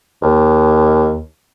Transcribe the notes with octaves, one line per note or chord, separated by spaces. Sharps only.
D#2